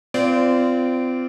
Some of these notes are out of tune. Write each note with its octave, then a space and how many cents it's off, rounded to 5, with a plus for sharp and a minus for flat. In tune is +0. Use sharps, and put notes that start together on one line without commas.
C4 -30 F4 -20 D5 -20